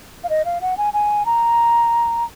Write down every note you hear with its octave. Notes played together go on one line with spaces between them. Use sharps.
F5
D#5
F5
F#5
G#5
G#5
A#5